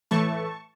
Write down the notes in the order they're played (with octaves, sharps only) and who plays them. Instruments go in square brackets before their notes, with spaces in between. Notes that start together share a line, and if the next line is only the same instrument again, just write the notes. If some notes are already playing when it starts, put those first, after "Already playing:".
[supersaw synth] A2 E3 A3 A5 C#6